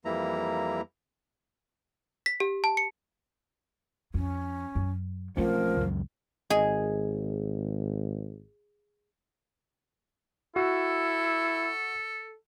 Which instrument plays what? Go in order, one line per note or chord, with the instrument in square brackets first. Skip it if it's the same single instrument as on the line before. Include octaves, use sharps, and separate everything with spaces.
[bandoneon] F2 E3 G3 A#3 E4 A#5
[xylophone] B6
G4
A5
C#7
[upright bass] F2 [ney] C#4
[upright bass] F#2
[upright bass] B1 F4 [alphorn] F3 [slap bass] A3 C4 C#4 [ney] A#4
[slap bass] C#2 F#2
[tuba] G#1 [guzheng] G#4 [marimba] D#5
[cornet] E4 [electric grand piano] F#4 [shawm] A4